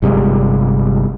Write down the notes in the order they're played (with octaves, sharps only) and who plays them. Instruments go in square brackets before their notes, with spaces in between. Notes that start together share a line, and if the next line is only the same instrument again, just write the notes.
[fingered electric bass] G1 C3 G3 G#3